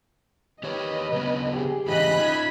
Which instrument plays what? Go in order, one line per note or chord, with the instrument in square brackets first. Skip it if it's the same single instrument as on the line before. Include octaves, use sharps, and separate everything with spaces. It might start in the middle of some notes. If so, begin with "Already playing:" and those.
[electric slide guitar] D#3 G4 C#5 [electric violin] B4 D#5
[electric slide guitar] C#3 F#3 B3
[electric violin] G4 G#4
[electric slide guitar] G#2 C#3 E3 [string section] D#5 B5 F#6
[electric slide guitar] D#4 F4 [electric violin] G#6 B6